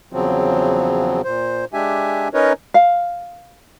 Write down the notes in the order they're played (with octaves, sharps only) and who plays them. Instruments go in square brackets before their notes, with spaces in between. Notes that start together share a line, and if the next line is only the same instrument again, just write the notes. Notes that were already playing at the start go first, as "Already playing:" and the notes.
[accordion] E2 C#3 F3 F#3 C4
A#2 C5
G#3 D4 G4 E5 G#5
C#4 D#4 A#4 B4 C#5 D#5
[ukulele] F5